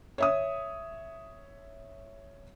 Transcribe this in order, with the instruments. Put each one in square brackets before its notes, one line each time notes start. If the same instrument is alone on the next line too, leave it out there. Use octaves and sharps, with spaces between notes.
[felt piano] C#5 E5 D#6